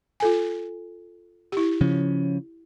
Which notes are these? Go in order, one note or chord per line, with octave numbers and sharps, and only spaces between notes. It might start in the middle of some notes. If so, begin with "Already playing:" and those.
F4 A4 G#5
E4 G4
C#3 F3 C#4